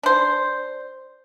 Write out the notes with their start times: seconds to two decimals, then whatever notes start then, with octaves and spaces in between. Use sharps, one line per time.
0.03 D4 C5